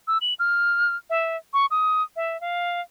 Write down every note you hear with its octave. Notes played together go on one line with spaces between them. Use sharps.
E6
F#7
F6
E5
C#6
D#6
E5
F5